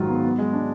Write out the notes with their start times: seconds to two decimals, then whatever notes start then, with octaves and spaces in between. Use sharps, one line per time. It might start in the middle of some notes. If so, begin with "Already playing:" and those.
Already playing: G#2 D#3 F#3 F4
0.09 B3
0.24 B3
0.38 G#3
0.53 D4